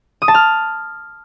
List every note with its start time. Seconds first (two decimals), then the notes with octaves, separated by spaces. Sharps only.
0.22 D#6
0.28 A5
0.34 F6